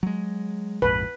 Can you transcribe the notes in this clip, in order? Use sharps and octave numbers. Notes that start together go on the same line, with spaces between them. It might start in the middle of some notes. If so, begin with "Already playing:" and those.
F#3 G#3
A#1 F2 G#2 B4